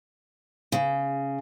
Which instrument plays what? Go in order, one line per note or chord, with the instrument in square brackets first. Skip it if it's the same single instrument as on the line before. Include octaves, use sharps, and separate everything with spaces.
[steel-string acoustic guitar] C#3